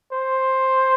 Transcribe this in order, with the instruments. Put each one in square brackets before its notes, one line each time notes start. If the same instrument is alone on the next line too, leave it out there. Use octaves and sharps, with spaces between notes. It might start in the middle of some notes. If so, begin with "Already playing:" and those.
[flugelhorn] C5